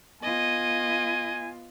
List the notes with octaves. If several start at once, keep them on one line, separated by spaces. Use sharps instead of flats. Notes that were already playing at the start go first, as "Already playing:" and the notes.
B3 F4 D#5 G#5